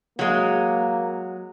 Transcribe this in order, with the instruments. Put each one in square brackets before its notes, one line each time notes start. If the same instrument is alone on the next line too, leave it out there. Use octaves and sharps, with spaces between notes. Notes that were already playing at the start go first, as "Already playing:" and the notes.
[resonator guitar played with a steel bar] F#3 G#3 [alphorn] A#3